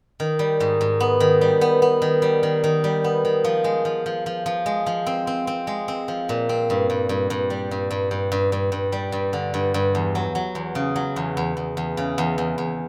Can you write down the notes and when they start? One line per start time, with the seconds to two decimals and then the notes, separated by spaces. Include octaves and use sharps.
0.20 D#3
0.39 G3
0.60 G#2
0.81 G#2
1.00 B3
1.20 D#3
1.41 G3
1.61 B3
1.82 B3
2.02 D#3
2.22 G3
2.43 D#3
2.64 D#3
2.84 G3
3.04 B3
3.25 D#3
3.44 F3
3.64 G#3
3.85 F3
4.06 F3
4.26 F3
4.46 F3
4.66 G#3
4.86 F3
5.07 C4
5.27 C4
5.47 C4
5.67 G#3
5.88 C4
6.08 F3
6.29 A#2
6.49 C4
6.70 G2
6.90 G2
7.09 G2
7.30 G2
7.50 G3
7.71 G2
7.91 G2
8.11 G2
8.32 G2
8.52 G2
8.72 G2
8.92 G3
9.12 G2
9.33 D3
9.54 G2
9.74 G2
9.95 E2
10.15 F#3
10.35 F#3
10.55 E2
10.75 C#3
10.96 F#3
11.16 E2
11.37 E2
11.57 E2
11.77 E2
11.97 C#3
12.18 E2
12.38 E2
12.58 E2